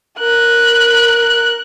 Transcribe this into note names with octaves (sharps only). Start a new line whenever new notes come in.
A#4 F#6